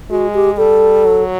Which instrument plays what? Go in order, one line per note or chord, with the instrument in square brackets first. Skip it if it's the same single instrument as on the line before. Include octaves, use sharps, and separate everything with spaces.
[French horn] G#3 [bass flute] F#4
[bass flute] G4
[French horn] G3 [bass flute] A4
[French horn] F#3